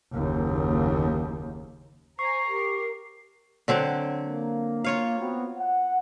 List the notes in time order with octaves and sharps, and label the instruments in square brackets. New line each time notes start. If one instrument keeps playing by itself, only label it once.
[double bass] F#1 D#2
[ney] C5 [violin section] G#5 A#5 [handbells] C#6 [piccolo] C7
[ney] G4 [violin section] A#4
[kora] D3 F#3 C4
[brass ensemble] A#3
[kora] F4 C#5 F5
[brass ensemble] B3 C4 F#4
F#5